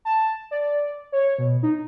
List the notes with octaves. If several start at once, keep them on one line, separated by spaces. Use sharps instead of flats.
A5
D5
C#5
B2
D#4